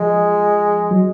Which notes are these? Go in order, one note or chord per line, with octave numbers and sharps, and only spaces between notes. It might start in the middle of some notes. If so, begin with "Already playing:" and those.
Already playing: F3 G#3
F#3